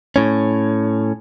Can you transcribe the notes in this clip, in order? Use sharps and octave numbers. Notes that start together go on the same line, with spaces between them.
A2 C#4